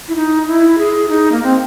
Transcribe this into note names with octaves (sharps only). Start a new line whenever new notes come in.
E4
D#4
E4
G#4
D#4
A#3
C4